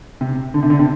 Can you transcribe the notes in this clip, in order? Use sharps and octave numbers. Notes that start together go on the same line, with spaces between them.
C3
D3
C3
D3
C3